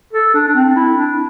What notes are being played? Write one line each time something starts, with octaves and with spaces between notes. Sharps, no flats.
A4
D4
D4
C4
E4
D4